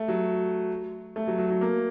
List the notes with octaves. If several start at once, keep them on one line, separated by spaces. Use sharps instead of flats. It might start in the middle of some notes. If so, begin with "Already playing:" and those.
Already playing: A3
F#3
A3
F#3
F#3
F#3
A#3